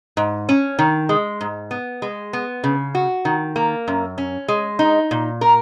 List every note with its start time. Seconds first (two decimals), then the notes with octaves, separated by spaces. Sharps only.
0.17 G#2
0.49 C#4
0.79 D#3
1.09 G#3
1.41 G#2
1.71 B3
2.02 G#3
2.33 B3
2.64 C#3
2.95 F#4
3.25 D#3
3.56 A#3
3.88 F#2
4.18 C#4
4.48 G#3
4.79 D#4
5.11 A#2
5.41 A#4